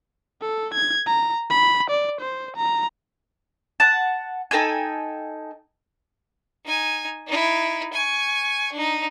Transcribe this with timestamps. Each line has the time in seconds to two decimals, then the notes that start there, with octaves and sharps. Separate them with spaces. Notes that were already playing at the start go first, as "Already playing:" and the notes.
0.42 A4
0.74 G#6
1.06 A#5
1.50 B5
1.90 D5
2.21 C5
2.57 A#5
3.80 F#5 A5
4.51 D#4 A4 G5 G#5
6.65 D#4 G#5
7.27 D#4 E4
7.93 G#5 C#6
8.73 D4 D#4